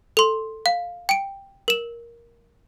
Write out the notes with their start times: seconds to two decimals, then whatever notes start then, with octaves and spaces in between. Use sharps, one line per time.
0.17 A4 C6
0.66 F5
1.09 G5 D7
1.68 A#4 E7